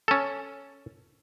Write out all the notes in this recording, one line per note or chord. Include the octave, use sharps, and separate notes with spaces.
C#4 A4